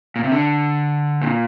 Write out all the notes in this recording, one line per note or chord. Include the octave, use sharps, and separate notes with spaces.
A#2
C3
D3
A#2